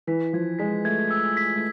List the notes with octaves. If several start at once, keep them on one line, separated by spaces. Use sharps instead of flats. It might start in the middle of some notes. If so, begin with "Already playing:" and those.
E3 B6
F3 G#6
G#3 B6
A3 G#6
E6
B6
A3